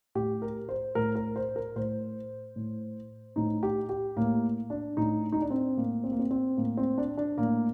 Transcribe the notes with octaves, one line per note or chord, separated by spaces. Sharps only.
A2 G4
A#4
C5
A2 A#4
A#4
C5
A#4
A2 C5
A2
A2 D#4
G4
G4
A2 A#3
D4
A2 D#4
D#4
D4
C4
A2 A#3
C4
A#3
C4
C4
A2 A#3
C4
D4
D4
A2 A#3